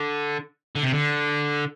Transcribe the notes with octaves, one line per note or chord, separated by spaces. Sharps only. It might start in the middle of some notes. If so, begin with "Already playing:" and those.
Already playing: D3
D3
C3
D3